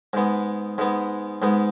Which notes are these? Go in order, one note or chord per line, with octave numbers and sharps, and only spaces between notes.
G#2 G#3 B3
G#2 G#3 B3
G#2 G#3 B3